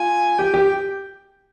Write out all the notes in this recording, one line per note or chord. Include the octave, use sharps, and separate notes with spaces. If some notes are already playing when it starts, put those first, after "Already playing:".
Already playing: F4 G#5
G4 G5
G4